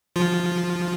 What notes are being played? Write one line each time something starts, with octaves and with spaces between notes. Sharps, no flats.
F3 F4